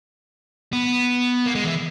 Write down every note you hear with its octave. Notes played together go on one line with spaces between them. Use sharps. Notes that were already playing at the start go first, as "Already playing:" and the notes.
B3
A#3
G#3
E3